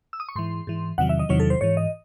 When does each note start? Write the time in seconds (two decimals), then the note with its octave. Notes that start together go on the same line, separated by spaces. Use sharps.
0.13 E6
0.20 D#6
0.29 C#6
0.36 G#2 E3 C6
0.67 G#2 E3
0.98 E2 C3 D#3 F#3 F#5
1.09 E5
1.19 D#5
1.29 E2 C3 D#3 F#3 C#5
1.40 A4
1.50 C5
1.61 G#2 E3 C#5
1.77 D#5